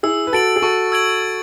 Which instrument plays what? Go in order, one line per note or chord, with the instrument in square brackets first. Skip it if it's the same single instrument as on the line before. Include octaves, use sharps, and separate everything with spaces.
[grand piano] E4 G#4 [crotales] E6
[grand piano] B4
[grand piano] F#4 A4 [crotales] A6 D7 F#7
[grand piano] G#4
[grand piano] F#4 A4 [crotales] C#6
[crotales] E6 G#6 D7 F#7
E6